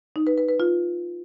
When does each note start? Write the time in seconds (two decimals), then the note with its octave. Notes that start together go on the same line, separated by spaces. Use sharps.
0.16 D#4
0.27 B4
0.38 B4
0.49 B4
0.60 F4